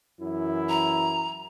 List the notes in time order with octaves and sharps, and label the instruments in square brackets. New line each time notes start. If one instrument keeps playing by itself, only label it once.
[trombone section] F#2 E3 E4
[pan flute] A#5